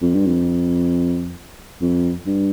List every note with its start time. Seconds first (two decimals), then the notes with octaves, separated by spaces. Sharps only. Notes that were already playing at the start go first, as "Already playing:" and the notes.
0.02 F2
0.15 G2
0.27 F2
1.81 F2
2.26 G2